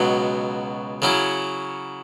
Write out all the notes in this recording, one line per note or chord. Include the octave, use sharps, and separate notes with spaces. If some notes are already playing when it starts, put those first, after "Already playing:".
Already playing: C#2 B2 F#3
C#3 F#3 C#4 E4